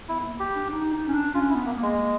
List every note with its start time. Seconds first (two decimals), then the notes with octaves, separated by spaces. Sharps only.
0.08 B3 E4
0.24 A#3
0.40 G4
0.55 D4
0.67 D4
0.72 D#4
0.93 D#4
1.08 C#4
1.13 D4
1.34 C#4 F4
1.50 E4
1.55 B3
1.66 A#3
1.77 A#3
1.82 G#3
1.97 A#3